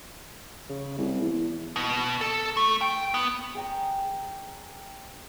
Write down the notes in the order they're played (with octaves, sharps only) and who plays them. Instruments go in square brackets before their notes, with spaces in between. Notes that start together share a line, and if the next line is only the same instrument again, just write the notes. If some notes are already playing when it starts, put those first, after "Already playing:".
[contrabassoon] C#3
C2
E2
[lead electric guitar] B2
A4
A3
G5
B3
[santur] G#4 G5 A#5